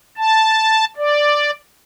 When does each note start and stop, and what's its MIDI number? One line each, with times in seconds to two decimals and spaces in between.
0.17 0.85 81
0.97 1.50 74